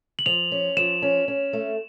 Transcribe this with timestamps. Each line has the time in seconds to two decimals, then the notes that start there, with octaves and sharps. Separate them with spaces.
0.19 F#7
0.26 F3 F7
0.52 C#4
0.77 F3 E7
1.02 C#4
1.28 C#4
1.53 A3